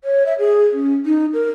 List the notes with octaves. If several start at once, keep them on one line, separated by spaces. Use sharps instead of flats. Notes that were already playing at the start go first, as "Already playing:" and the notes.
C#5
E5
G#4
C#4
D#4
A#4